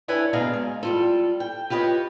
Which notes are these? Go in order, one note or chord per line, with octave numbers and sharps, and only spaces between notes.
D4 E4 A4 B4 C#5 G#5
D2 B2 D4 G#4 F5 A#5
G#3
G3 F4 A4
G5
F4 G4 B4 C#5 D#5